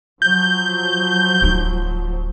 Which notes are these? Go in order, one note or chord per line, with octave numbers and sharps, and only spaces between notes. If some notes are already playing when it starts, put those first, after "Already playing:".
F3 F#3 G6
D1 D#4